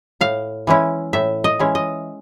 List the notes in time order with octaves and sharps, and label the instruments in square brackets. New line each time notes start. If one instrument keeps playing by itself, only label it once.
[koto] A2 F5
E3 G#3 C#4 E4
A2 E5
D#5
E3 G#3 C#4 E4
D#5